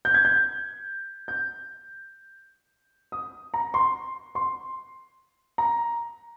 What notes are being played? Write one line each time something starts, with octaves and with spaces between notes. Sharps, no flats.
G6
G#6
G6
G6
D#6
A#5
C6
C6
A#5